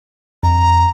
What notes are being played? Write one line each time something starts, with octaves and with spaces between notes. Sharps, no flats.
F2 A#5